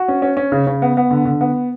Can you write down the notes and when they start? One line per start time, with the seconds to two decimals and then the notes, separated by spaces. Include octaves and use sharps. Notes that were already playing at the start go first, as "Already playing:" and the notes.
Already playing: F#4
0.08 C#4
0.22 C#4
0.37 C#4
0.52 C#3
0.67 C#3
0.82 B3
0.97 B3
1.11 D3
1.25 D3
1.41 B3